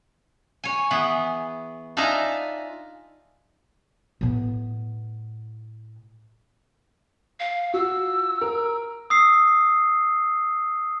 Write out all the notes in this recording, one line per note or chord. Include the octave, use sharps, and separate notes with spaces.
C#5 G#5
E3 B3 G#4
D4 D#4 F4 E5 G#5 A#5
A2 B3
F5
F4 F#4 E6
A#4
D#6 E6 C7